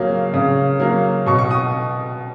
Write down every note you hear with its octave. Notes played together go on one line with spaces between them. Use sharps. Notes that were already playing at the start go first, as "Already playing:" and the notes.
Already playing: C#3 F#3 A#3
C#3
F#3 A#3
B2 C#6
C#6
D#6